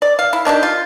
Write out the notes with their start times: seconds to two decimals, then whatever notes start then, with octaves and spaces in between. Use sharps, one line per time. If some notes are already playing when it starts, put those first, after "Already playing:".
0.02 D5
0.19 F5
0.33 E4
0.45 D#3 D4 F#4 G4
0.63 F4